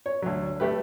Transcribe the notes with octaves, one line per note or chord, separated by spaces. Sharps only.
C#5
D2 F#3
A3 G4 B4